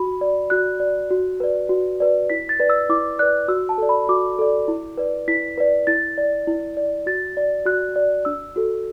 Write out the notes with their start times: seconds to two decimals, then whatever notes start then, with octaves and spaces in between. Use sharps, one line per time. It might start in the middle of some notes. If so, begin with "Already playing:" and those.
Already playing: F#4 B5
0.21 D5
0.50 F#4 F#6
0.80 D5
1.10 F#4
1.40 B4 D5
1.69 F#4
2.00 B4 D5
2.30 E4 B6
2.49 A6
2.60 B4 D5
2.70 E6
2.89 E4 D6
3.19 B4 D5 F#6
3.48 F#4 E6
3.69 A5
3.78 A4 D5
3.89 B5
4.09 F#4 D6
4.39 A4 D5
4.68 E4
4.98 B4 D5
5.28 E4 B6
5.58 B4 D5
5.87 E4 A6
6.18 D5
6.47 E4
6.77 D5
7.06 F#4 A6
7.37 D5
7.65 F#4 F#6
7.96 D5
8.25 D4 E6
8.56 F#4 A4